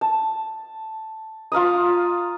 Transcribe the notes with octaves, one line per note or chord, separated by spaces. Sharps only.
A5
F4 F5 A#5 D#6